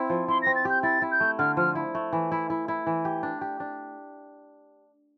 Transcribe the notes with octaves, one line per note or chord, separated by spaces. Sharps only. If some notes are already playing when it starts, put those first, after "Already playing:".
Already playing: C4 E4
F3
E4 C6
C4 A#6
A6
G4 G6
E4 A6
E4
G6
A3
D3 F6
F3 F6
E4
A3
E3
E4
E4
E4
E3
G4
D4
G4
D4